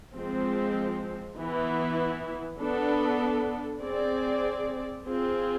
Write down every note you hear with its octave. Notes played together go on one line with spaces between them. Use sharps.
F3 G#3 C4
E3 B3 E4
B3 D4 A4
C4 G#4 D5
C4 F4 G#4